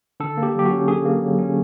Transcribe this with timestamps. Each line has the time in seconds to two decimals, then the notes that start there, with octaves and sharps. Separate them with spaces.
0.20 D3 A4
0.37 A#3
0.43 G4
0.55 F#3 G4
0.65 F#4
0.71 C#4
0.88 D3 G#4
1.05 A#3
1.22 F#3
1.39 C#4